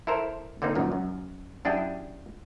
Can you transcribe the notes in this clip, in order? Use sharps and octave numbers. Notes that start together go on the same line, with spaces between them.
E4 A4 A#4 C5
D3 A#3 C4 D#4
C#2 F#2 A#2 D#3
F#2
F#2 D4 E4 G4 G#4 G5